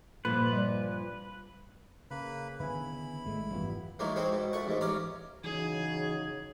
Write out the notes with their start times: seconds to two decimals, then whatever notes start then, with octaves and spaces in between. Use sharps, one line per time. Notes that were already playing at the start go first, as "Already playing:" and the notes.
0.25 G2 A#2 F3 A4 B4
0.53 G3 D5
2.11 C#3 A#3 B4 B5
2.60 D3 D#3 B3 E4 B4 G#5 B5
3.26 G#1 G#3 A3
3.51 F#2 E3 G3 B3 F4
3.99 A2 D#3 E3 F#3 G#3 A#3
4.16 F#3 G#3 C4 F#4 G#4
4.32 G#2 B2
4.53 A#2 A3 F#5 C#6
4.66 A1 G#2 G#3
4.81 A1 C#4 F4 D5 A#5
5.44 C#3 E3 F#3 D#4 G#4 G#6